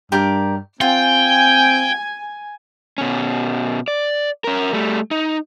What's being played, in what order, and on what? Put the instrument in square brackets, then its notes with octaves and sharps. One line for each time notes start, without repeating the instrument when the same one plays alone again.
[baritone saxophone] G2 [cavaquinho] G4 A#4 D5
[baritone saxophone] C4 [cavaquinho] F4 [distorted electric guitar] G5 [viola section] G#5
[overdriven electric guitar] B2 C#4
D5
C#4 A#4
G3 A3
D#4